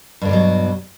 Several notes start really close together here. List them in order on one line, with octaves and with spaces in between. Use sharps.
G2 D3 B2 F#3